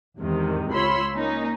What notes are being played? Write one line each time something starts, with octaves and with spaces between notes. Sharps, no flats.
E2 G#2 C3 D#3
C#2 F4 C#5 B5 C6 E6
A#3 C#4 D#4